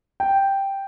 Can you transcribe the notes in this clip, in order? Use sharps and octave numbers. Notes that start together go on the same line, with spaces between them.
G5